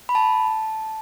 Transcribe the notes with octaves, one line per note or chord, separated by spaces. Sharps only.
B5
A5